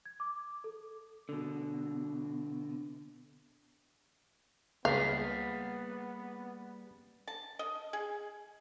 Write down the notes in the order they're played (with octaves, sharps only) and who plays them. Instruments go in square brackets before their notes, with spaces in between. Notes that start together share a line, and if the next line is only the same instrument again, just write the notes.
[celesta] G#6
D6
A4
[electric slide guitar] B2 D3
[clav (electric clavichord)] C#2 [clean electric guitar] G3 A#3 G#4 [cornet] B3 [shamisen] F5
[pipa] A5
D#5
G#4